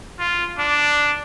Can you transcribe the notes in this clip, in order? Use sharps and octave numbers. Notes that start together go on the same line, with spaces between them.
F4
D4